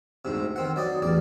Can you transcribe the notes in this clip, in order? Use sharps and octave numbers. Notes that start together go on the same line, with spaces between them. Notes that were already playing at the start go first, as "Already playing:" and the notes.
D2 G#2 C3
D#3 C4 F#5
F#3 D5 D#5
A1 E2 D5